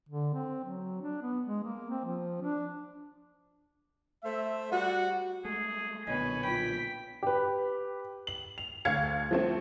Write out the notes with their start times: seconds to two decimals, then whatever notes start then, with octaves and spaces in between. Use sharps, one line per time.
0.09 D3
0.34 C4
0.64 F#3
1.02 D4
1.22 B3
1.46 G#3
1.63 A#3
1.90 C4
2.05 F3
2.42 D4
4.24 A3 C5 E5
4.71 G3 F#4 F#5
5.45 G#3 A3 G#4
6.07 B1 A#2 D3 B3 B4 C#5 D#5 G#5
6.43 F4 G5 B5 B6
7.23 G4 B4
8.27 F#7
8.58 F7
8.85 D2 F5 G#6 C#7
9.31 F3 A3 C4